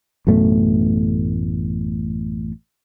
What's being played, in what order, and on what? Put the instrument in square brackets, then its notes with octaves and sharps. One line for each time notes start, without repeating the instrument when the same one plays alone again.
[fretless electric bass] A1 F#2 B2 A3